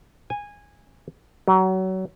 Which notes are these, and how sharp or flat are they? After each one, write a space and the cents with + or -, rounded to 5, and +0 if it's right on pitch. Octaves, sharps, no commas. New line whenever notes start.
G#5 -15
F#3 +30